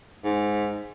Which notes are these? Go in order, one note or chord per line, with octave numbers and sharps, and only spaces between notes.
G#2